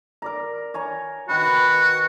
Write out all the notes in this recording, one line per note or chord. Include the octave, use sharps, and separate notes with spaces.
A#4 D5 A#5
C#5 G#5 A#5
D#3 F#4 B4 B5